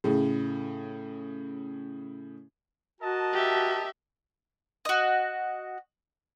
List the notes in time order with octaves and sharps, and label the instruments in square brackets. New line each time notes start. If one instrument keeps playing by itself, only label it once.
[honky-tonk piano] A2 C#3
[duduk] F#4 [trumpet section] A#4 D#5 A5
[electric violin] G4 E5
[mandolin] F#4 D#5